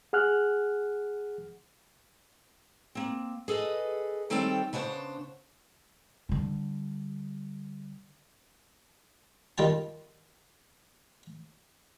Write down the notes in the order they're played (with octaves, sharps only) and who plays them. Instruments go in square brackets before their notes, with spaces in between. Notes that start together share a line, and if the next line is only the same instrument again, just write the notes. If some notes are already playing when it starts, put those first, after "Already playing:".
[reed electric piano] G#4 F#5 F6 F#6
[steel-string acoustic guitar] A#3 C4
G#4 A4 B4 D#5
D#3 G3 C4 A4 C#5 G5
C#3 B3 D4 C5 C#5
[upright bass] D3 G3
[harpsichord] D#3 G3 F4 G5 A5